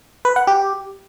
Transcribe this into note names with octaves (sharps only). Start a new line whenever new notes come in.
B4
F#5
G4